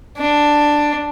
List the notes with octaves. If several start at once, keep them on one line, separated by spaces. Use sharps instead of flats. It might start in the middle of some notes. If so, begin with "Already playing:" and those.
D4